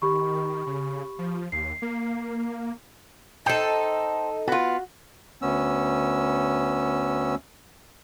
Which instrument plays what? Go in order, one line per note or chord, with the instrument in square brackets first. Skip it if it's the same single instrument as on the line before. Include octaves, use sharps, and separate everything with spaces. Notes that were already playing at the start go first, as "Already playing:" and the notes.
[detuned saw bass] D#3 [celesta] G4 B5 C#6
[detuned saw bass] C#3
F3
[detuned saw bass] D#2 [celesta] C7
[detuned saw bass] A#3
[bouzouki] D#4 A4 [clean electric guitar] C5 G5 [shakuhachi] D#5
[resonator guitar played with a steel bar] B3 F4 [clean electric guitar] F#4
[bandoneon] D2 B3 C#4 E6